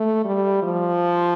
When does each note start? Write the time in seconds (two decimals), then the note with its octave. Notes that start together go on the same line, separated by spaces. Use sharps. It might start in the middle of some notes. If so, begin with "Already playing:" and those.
Already playing: A3
0.25 G3
0.63 F3